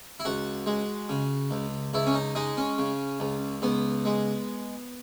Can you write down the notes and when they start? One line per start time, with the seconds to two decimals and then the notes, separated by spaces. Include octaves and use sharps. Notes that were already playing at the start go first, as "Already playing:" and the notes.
0.20 E4
0.25 C#2 F#4
0.66 G#3
1.09 C#3
1.51 C#2
1.94 C#2 E4
2.07 C#4
2.14 D#4
2.35 G#3 D#4
2.57 C#4
2.78 C#3
3.20 C#2
3.62 C#2 B3
4.05 G#3